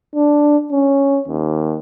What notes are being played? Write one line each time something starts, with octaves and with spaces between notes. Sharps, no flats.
D4
C#4
D#2